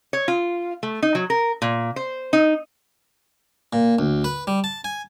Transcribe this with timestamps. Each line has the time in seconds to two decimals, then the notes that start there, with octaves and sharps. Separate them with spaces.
0.13 C#5
0.28 F4
0.83 A3
1.02 D#4
1.15 F#3
1.30 A#4
1.62 A#2
1.96 C5
2.33 D#4
3.73 A#2
3.99 D2
4.24 B4
4.47 G3
4.64 A5
4.84 G#5